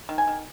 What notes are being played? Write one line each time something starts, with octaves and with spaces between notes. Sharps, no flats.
D#3
G#5
D#3